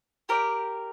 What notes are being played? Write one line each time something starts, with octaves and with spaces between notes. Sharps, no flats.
G4 A#4 D5